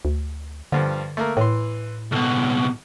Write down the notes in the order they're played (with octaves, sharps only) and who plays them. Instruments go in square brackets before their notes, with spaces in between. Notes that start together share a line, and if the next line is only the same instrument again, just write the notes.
[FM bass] D2
[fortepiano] G2 F3 [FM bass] D3
[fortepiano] A3 A#3 A#4
[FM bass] A2 [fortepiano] E3 C6
[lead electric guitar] C#2 B2 [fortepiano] A4